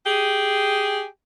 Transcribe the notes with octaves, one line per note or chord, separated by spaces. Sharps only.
G4 G#4